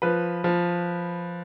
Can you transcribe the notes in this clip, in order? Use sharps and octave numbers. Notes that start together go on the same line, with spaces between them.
F3 B4
F3